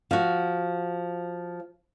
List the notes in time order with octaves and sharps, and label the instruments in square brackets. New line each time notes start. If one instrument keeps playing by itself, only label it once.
[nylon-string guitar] F3 F#4